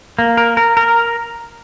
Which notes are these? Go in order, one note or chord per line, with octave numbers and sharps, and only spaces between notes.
A#3
A#4
A#4
A#4